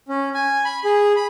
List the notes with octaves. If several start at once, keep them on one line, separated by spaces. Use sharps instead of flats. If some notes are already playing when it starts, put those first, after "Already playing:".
C#4
G#5
B5
G#4
B5